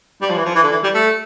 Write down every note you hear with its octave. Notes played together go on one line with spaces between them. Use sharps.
G3
F3
E3
F3
E3
D3
E3
G3
A3